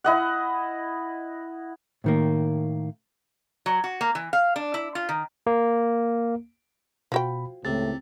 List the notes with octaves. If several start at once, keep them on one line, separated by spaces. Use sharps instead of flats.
E4 D#5 F#5
A2 D#3 A#3
F#3
F#4
A#3
E3
F5
D4
E4
F4
D#3
A#3
B2 F3 F#4 G5 B5
C#2 A2 C3 A6